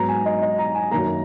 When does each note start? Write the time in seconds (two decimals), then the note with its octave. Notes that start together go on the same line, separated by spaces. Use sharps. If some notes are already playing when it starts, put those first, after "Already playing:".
Already playing: G#2 F#3 B3 A#5
0.08 G#5
0.25 D#5
0.42 D#5
0.58 A#5
0.75 G#5
0.91 F#2 D#3 A#3 A#5